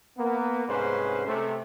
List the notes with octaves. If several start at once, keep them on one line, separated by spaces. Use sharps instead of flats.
A#3 B3
C2 G#2 C#4 G#4 B4 C5
C3 A3